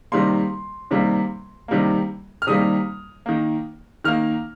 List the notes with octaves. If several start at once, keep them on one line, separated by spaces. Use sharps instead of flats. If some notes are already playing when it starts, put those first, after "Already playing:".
C3 D#3 G3 A#3 C6
C3 D#3 G3 A#3
C3 D#3 G3 A#3
F6
C3 D#3 G3 A#3 D#6
D#3 A#3
D#3 A#3 F6